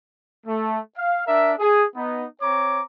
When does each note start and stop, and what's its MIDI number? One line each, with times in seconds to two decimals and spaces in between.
0.47 0.79 57
0.96 1.24 77
1.27 1.53 62
1.27 1.53 70
1.27 1.53 76
1.59 1.85 68
1.96 2.25 59
1.96 2.25 63
2.41 2.81 60
2.41 2.81 73
2.41 2.81 82
2.41 2.81 86